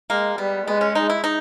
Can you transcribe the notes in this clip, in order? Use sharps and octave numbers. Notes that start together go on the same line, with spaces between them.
G#3 A#3
G3 B3
G#3 B3
C#4
D#4
E4
D#4